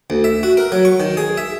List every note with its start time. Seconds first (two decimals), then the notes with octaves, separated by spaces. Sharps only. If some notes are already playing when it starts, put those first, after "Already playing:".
0.10 D2
0.24 E5
0.43 F#4
0.57 A#4
0.72 F#3
0.85 C#6
1.00 D#3
1.17 G#4
1.37 E5